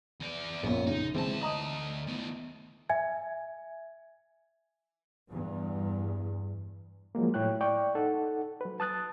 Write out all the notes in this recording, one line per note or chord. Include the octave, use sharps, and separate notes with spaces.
E2 D5
A#1 F#2 A#2 B3
C#3 D#4
D2 E3 G#3 C4 A5
D#5 A#5 D#6
D#3 B3
E5 G#5 G#6
E2 G2
F3 F#3 G#3 A#3
A2 E4 C#5 G5 F#6
D5 G5 C#6
D#4 A4 F#5
F#3 B4
A5 D#6 F#6 A6